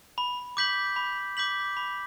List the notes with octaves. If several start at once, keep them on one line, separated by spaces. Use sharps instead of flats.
B5
D6 G6 B6 F#7
B5
D6 G6 B6 F#7
B5